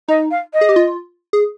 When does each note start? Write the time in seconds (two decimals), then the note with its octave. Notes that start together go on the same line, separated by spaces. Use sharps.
0.08 D#4 D#5
0.31 F5
0.54 D#5
0.61 G#4
0.69 G4
0.76 F4
1.33 G#4